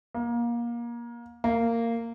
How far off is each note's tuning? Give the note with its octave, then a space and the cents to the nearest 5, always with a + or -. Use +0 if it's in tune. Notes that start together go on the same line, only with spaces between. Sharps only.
A#3 +25
A#3 -15